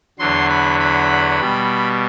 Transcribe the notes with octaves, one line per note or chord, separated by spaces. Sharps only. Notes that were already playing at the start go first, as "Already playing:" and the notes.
E2 D3 F#3 C6
B5
B5
B2 G3